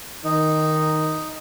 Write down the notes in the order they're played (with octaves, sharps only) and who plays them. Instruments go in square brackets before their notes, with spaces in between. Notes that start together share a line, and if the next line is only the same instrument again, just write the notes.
[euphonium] D#3 [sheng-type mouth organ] D#4